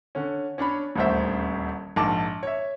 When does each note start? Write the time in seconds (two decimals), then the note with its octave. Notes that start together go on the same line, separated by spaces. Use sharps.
0.15 D3 C#4
0.58 C#4 D4 C#5 B5
0.96 D#1 A1 D2 C5 E5
1.96 A#1 G#2 A5 D6
2.43 C#5 E5